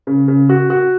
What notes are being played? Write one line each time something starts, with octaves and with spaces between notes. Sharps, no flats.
C#3
C#3
F#4
F#4